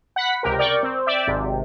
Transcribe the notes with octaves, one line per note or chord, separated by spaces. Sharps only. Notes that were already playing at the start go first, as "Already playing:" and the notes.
F#5 B5 B6
C#2 C3 G4 A#4
A#4 D5 G5 C#6 D6
C4
D5 E5 G5
G#1 C3